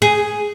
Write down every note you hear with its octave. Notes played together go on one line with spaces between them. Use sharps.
G#4